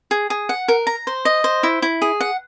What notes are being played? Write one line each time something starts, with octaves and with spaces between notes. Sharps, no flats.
G#4
G#4
F#5
A#4
A#5
C5
D#5
C5
E4
E4
G#4
F#5